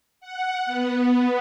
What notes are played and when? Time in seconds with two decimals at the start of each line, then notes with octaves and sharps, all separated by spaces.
0.20 F#5
0.66 B3